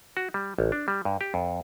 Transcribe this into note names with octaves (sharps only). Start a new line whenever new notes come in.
F#4
G3
A1
D4
G3
G2
G4
F2